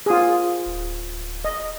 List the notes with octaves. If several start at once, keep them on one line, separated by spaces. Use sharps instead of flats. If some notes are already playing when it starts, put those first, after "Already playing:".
F4 G#4
D1
D#5